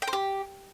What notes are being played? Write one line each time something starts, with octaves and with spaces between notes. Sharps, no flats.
G5
C5
G4